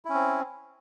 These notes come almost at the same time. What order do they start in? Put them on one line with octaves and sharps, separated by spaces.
E4 C#4 C4